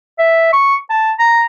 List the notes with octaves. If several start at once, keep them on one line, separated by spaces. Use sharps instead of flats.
E5
C#6
A5
A#5